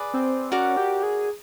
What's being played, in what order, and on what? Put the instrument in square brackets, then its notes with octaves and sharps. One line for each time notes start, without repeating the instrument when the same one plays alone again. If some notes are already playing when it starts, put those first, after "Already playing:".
Already playing: [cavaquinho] G#4 B4 D5
[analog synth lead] C4
[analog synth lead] C#4 [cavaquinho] F#4 A#4 D5 F#5
[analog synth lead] G4
G#4